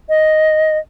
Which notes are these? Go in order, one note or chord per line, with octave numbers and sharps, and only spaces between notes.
D#5